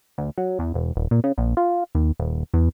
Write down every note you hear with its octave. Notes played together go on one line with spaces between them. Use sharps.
D2
F#3
E2
E1
D#1
A#2
C#3
A#1
F4
D#2
D#1
E2